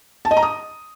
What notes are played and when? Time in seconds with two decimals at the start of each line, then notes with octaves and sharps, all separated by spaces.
0.25 A5
0.31 D#5
0.37 A#5
0.43 D#6